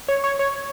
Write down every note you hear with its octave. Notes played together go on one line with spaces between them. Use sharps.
C#5
C#5
C#5